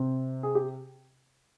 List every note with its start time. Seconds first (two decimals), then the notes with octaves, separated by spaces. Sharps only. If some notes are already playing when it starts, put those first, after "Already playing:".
Already playing: C3 C4
0.43 G#4
0.55 G4